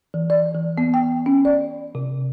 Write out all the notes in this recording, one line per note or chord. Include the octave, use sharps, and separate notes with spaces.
E3
D5
E3
B3
G5
C#4
D5
C3